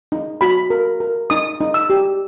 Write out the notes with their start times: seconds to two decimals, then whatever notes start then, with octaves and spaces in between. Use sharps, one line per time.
0.12 D#4
0.41 F#4 B5
0.70 A#4
1.00 A#4
1.30 D#4 D#6
1.61 D#4
1.74 E6
1.90 G4